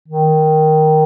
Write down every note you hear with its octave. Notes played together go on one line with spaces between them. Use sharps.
D#3